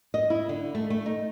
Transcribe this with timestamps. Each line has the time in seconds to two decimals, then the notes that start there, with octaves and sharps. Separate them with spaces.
0.14 D#5
0.30 E4
0.49 D3
0.75 A3
0.90 A3
1.06 D#4